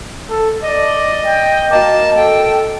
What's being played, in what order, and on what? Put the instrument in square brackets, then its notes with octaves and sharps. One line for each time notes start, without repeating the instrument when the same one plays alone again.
[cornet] A4
[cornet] D5 [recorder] D#5
[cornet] G5
[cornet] A#3 [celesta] F#4 D#5 D6 [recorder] A5
[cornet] A4 [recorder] G5